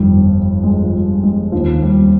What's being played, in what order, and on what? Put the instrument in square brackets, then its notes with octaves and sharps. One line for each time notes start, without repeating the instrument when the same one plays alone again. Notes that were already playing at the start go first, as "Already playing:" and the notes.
Already playing: [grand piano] G1 F2 D#3 G3
G#3
F3
G3
G#3
D#2 D#3 F3
G3